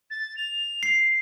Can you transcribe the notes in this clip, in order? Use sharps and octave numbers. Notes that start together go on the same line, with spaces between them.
A6
F7
C7